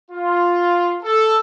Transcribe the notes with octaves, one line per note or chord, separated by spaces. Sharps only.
F4
A4